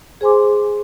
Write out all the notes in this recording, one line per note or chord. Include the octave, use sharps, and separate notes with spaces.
G#4 C5 G#5 C6 D6